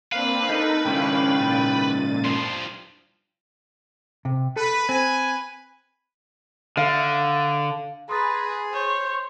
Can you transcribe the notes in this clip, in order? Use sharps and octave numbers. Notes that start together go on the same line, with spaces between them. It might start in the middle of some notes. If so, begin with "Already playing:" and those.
A#3 C4 D4 B4 F5
D#4 A4 A#4
G#2 C#3 C#4 D4 E4 F5 G5
A#2 A6 D#7
G2 F3 C6
C3
A4 B4
C4 B4 G#5
D3 F5
G#4 B4 A#5 C6 D#6 A6
C5 C#5